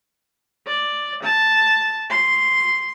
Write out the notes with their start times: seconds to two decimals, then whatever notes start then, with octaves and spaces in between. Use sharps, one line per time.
0.67 D5
1.23 A5
2.10 C6